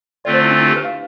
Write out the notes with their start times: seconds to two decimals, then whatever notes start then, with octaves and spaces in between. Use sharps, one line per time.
0.25 D3 A3 C4 F4 D5
0.33 C5
0.42 E4
0.51 D4
0.59 E4
0.68 G4
0.76 B4
0.84 F5